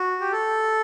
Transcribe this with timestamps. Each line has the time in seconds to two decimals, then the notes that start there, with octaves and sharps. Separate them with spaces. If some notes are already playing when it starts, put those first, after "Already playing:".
Already playing: F#4
0.21 G4
0.32 A4